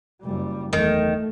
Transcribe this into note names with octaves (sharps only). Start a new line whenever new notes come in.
F#1 G3
F#1 E2 D#3 A3